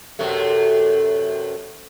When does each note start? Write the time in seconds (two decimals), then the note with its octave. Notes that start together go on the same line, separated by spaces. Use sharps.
0.19 F#2 C3 A3